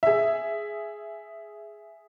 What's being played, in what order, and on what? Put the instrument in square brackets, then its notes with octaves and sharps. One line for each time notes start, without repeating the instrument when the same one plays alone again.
[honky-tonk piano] G#4 E5